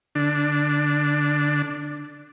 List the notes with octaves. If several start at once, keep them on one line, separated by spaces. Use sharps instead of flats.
D3 D4